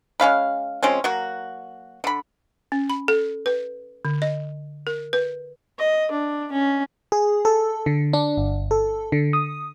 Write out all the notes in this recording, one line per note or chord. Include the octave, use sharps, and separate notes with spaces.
G#3 C#4 F5 B5
F3 G#3 C4 C#4
F#3 A#3 F#4
D3 B5
C#4
B5
A4
B4
D3
D#5
A#4
B4
D#5
D4
C#4
G#4
A4
D3
D4
G1
A4
D3
D#6